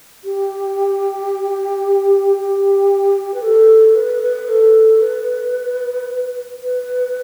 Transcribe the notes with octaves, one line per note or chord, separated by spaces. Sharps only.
G4
G4
B4
A4
B4
B4
A4
B4
B4